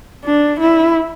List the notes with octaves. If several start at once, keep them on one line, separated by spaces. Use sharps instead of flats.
D4
E4